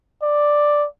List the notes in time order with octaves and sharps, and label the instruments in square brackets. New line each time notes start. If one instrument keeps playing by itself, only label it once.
[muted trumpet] D5